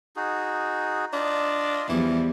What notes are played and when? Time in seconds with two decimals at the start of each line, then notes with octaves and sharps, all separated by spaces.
0.16 D#4 F#4 G#4
1.13 D4 F4 D#5
1.89 E2 E3 F3 G3